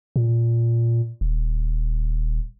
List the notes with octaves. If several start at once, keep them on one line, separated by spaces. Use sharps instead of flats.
A#2
D#1